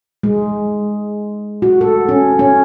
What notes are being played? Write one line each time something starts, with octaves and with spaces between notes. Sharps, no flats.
G#3
F#4
A4
C#4
C#4